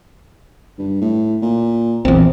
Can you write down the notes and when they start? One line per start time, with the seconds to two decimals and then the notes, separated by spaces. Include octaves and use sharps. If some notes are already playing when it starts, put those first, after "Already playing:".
0.78 G2
1.01 A2
1.42 A#2
2.05 A#1 E2 C4